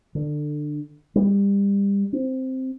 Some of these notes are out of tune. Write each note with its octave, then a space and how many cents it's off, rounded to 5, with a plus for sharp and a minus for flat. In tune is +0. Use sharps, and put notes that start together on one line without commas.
D3 +20
G3 +30
C4 +0